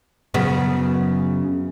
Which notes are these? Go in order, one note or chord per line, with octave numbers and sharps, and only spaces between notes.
F#2 C#3 B3